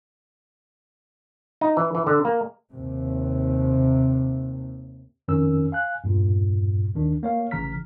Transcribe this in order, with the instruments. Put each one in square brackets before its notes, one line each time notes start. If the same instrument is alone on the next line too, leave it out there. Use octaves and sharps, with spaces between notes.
[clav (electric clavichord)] D#4
E3
E3
D3
A#3
[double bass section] D#2 C3
[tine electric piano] F2 D#3 C#4 A#4 E6
F5 G#5 F#6
E2 G2 A#2
D#2 D#3 D4
A#3 C#5 F5
A1 C#3 E3 A#5 F6 B6